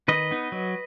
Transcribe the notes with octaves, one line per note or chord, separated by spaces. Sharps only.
D#3 B4 D#5
B3 D#4
F#3